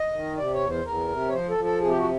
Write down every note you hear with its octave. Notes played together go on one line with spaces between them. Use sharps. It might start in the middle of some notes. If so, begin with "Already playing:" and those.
Already playing: D#5
D#3
C3 D5
C#5
E2
C5
E2 A#4
C3
C#5
F3 C5
A4
F3
A4
C3 G#4
G4
F#4